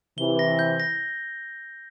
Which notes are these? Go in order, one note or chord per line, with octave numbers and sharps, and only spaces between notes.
C3 E3 G7
A#6
G6
A#6